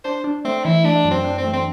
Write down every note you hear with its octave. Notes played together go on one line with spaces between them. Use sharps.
D4 C5
D4
A3 C4
E3 E4
A3 D4
F#2
C4
D4
C4
A3
C4